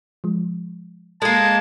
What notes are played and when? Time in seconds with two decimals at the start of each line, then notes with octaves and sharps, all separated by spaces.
0.24 F3 G#3
1.22 G#3 A#3 A4 A5 G#6